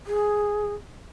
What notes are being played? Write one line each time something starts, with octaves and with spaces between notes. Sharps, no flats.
G#4